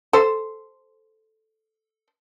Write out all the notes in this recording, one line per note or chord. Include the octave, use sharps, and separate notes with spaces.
A4 C5